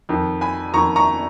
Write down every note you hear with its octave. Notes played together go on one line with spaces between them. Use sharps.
F2 D#3
G#5 B5
F2 D#3 A#5 C#6
A#5 C#6